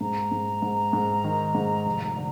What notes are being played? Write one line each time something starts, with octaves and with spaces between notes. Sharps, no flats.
G#2 A#5
G#2
G#2
G#2
D#3
G#2
F1
D3